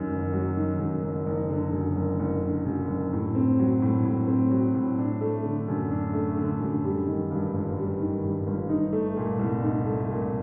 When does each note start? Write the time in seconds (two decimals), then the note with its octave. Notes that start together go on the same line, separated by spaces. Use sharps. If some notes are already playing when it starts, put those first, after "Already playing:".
Already playing: F#2 D#3 F#3
0.10 F#1
0.33 F#3
0.57 D#3
0.80 F#2
1.03 F#1
1.26 F#1
1.49 D3
1.73 F#2
1.96 F#1
2.19 F#1
2.43 D3
2.65 F#2
2.88 F#1
3.13 A2
3.35 C4
3.59 F#3
3.82 A2
4.04 A2
4.28 C4
4.51 F#3
4.74 A2
4.98 D4
5.21 A3
5.44 D3
5.68 F#2
5.91 D4
6.14 A3
6.38 D3
6.60 F#2
6.84 G3
7.07 D#3
7.31 G2
7.54 G1
7.77 G3
8.00 D#3
8.23 G2
8.47 G1
8.69 D#4
8.92 A3
9.17 A#2
9.39 C2
9.63 D#4
9.86 A3
10.10 A#2